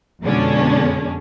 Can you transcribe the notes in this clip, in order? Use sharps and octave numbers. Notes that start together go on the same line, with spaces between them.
F2 B2 D3 G#3 C#4 D4